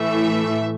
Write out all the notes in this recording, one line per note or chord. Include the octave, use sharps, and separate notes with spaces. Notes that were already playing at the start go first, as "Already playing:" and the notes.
Already playing: A2 E3 A3 E5